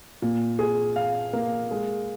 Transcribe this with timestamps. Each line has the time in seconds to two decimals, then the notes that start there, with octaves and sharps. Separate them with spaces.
0.22 A#2
0.59 G#4
0.96 F5
1.33 A#3
1.71 G#3